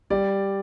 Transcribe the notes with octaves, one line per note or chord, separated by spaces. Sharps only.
G3 D5